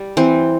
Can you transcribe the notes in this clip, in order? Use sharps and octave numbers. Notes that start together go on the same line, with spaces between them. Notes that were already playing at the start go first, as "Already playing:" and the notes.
Already playing: G3
E3 C4